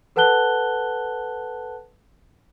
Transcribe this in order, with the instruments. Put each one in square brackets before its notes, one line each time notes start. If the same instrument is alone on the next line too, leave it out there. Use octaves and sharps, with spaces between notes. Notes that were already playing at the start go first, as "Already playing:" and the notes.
[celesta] A4 B4 F#5 A5 F#6 G7